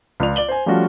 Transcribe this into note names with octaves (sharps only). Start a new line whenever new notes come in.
C#2 F4 D5 F7
D5 F#7 G7
C5 G#5
F3 G3 A3 C#4 F4 F#4